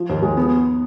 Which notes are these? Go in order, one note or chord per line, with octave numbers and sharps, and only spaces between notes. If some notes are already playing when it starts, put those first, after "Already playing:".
Already playing: F3
D#2
G#3
B3